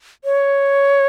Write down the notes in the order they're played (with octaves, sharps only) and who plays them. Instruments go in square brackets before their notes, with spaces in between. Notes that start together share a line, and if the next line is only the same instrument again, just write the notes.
[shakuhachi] C#5